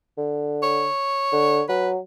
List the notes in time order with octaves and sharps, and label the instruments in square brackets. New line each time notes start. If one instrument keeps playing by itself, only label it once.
[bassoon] D3
[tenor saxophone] C#5
[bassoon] D3
[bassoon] F#3 [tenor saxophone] B4